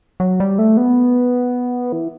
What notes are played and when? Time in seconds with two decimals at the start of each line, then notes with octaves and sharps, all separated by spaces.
0.20 F#3
0.40 G3
0.59 A3
0.77 B3
1.92 E3